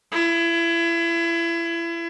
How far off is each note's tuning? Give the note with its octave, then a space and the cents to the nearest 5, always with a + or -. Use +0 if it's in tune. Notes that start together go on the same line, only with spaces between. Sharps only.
E4 +30